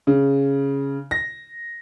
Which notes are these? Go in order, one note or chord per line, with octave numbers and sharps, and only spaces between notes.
C#3
A#6